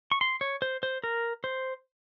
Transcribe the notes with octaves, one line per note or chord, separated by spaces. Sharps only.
C#6
C6
C#5
C5
C5
A#4
C5